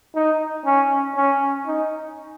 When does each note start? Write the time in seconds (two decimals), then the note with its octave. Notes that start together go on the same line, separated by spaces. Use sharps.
0.15 D#4
0.65 C#4
1.16 C#4
1.67 D#4